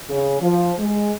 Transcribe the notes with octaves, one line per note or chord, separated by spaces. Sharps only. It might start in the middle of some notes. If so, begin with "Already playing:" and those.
C#3
F3
G#3